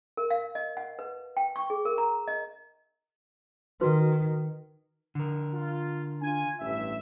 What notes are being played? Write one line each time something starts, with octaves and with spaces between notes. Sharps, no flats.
A#4
F5
D#5
F#5
B4
G5
C#6
G#4
A#4
A#5
D#5
D#3 F#4 B4
D3 A#4
F4
D4 F4 G#5
A1 G2 E5